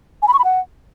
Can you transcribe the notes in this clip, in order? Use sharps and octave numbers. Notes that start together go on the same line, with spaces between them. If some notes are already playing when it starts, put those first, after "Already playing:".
G#5
B5
C#6
B5
F#5